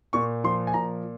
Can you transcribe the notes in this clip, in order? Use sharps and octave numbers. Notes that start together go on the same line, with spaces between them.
A#2 C#6
F3 C6
G#5
A#2 A#5